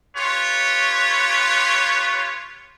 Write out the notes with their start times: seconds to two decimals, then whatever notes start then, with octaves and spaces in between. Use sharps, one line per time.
0.16 F4 G4 B4 C#5